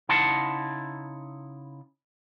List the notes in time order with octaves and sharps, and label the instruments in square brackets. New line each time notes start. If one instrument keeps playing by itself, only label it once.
[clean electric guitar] C#3 D#4 E4 F#5 A5 C6